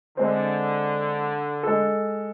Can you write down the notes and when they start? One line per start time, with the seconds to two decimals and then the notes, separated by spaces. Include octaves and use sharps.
0.17 D3 G#3 C4
1.63 G#3 A4